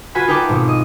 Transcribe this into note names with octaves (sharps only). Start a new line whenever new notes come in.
F4 F#4 B4 F#5 G#5 B5
D#4 A#4 B4 G5 A5 D6
G#1 B2
D#5